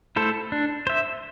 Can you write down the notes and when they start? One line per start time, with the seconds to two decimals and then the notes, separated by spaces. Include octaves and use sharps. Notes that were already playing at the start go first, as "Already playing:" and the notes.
0.16 A3 E4 A4 C5
0.52 D4
0.87 C5 E5